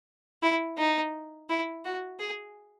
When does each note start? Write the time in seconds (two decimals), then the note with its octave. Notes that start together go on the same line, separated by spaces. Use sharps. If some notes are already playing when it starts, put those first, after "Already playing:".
0.42 E4
0.78 D#4
1.49 E4
1.85 F#4
2.20 G#4